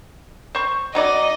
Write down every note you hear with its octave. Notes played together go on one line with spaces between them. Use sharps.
C5 C#6
F#3 D#4 D5 D#5